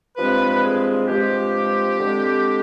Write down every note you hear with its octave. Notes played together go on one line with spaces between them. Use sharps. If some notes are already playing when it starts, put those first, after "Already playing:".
G2 F3 G#3 C4 B4
G#4
G2 F3 G#3 C4 G4
D3 G#3 C4